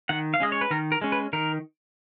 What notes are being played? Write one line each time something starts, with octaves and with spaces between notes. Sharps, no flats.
D#3 F#5
F5
G#3 C#4 D#5
C#5
B4
D#3 A#4
A#4
G#3 C#4
B4
D#3 A#4